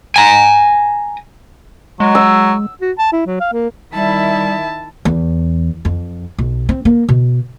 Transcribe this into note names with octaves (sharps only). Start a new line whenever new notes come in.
G#5 A#5
F#3 G#3
E6
F#4
A5
E4
F#3
F5
A#3
D#3 G3 E4 E5 A5
E2
F2
B1
C4
A#3
B2